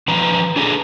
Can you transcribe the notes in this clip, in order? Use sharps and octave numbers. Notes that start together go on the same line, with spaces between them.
D#3 F3 B4 A#5
D4 G#4 A4 B4 A#5